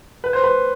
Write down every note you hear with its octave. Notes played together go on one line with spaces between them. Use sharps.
B4
C5
B4